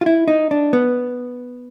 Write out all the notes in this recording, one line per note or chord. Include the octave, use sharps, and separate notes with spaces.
F4
E4
D#4
D4
B3